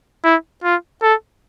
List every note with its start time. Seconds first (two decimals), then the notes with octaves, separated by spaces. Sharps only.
0.24 E4
0.63 F4
1.02 A4